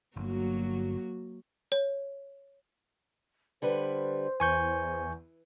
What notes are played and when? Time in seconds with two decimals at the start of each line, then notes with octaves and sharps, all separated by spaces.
0.16 G1 F#3 A#3 F#4
1.72 C#5
3.62 D3 G3 B4 C5
4.40 E2 E3 G#5 C#6 G6